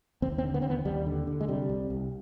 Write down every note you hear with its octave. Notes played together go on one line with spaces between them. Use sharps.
D#2 C4
C4
D3
B3
D#2 C4
B3
D#2 G3
D3
D3
G#3
C3 G3
C2
C2